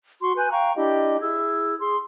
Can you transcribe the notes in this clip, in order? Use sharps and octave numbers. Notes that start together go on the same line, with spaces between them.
F#4 C6 C#6
B4 G#5 F#6 G6
F5 G5 A#5 C#6
D4 E4 G4 D#5
E4 G#4 E6 G#6
G#4 C6